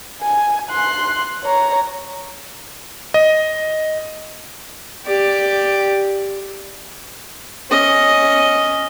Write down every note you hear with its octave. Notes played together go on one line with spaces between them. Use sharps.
G#5
C6 F#6
C#5 A#5
D#5
G4 D5
C#4 D#5